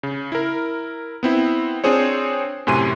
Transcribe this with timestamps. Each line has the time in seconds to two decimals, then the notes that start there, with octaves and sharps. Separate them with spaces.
0.03 C#3
0.32 E4 A#4
1.23 B3 C4 E4
1.84 C4 D4 F4 G#4 C5 C#5
2.67 F#2 A2 C3 G#5 C6 D#7